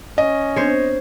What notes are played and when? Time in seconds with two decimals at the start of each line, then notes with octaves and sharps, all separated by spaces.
0.18 C#4 D#5
0.56 B3 C4 D4 C5 C#5